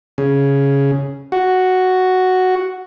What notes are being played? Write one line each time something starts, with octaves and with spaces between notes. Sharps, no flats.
C#3
F#4